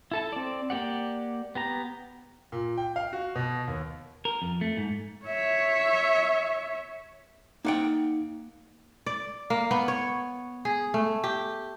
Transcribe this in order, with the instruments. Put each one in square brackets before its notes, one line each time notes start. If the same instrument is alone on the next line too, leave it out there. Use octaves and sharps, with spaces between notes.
[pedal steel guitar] E4 A4 A5
C4 D5
A#3 G4 D5 F#5
B3 G4 A#5
[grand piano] A#2
G5
F5
F#4
B2
D#2
[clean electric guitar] A#4
F2
A3
G#2
[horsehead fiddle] C#5 E5
[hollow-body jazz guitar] A#3 F#5 G5 [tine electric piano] D#4
[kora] D5
A#3
B3
C#5
G#4
A3
G4